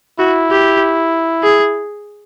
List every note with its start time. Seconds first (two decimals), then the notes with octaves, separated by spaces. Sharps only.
0.19 E4 F#4
0.50 G4
1.43 G#4